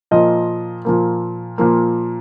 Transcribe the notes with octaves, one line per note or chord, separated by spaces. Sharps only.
A#2 F3 A#3 D#5
A#2 F3 A#3
A#2 F3 A#3